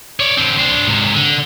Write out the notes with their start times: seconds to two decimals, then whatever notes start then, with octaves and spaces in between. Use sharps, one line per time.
0.20 C#5 D5
0.37 D3 C4
0.58 D4 C5
0.87 G#2 C3
1.14 D3